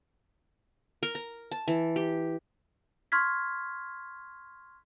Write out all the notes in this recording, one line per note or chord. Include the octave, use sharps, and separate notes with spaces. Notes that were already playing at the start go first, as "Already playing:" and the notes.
A#4
A#5
A5
E3
G4
C6 C#6 F6 G#6 B6